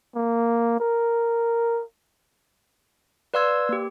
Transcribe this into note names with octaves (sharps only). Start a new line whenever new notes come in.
A#3
A#4
B4 D5 F5 C6 E6 G#6
A#3 G4